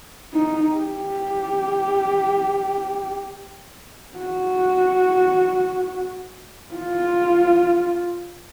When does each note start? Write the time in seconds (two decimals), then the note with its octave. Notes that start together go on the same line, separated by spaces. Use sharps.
0.33 D#4
0.75 G4
4.18 F#4
6.75 F4